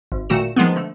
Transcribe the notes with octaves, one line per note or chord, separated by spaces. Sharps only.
G#1
A#2 D#3 A3 F#4 E7
D#3 F3 G#3 A3 B3
D3 A3